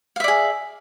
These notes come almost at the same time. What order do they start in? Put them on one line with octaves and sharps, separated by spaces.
F5 E5 D5 G#4